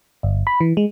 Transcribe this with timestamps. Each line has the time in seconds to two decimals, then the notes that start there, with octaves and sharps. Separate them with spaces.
0.23 G1
0.47 B5
0.61 E3
0.77 G#3